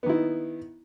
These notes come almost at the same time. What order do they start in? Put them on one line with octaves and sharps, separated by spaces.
B3 D#3 E4